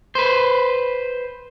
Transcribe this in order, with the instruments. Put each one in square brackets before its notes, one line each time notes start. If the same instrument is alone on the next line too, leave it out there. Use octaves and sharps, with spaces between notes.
[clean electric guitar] B4 C5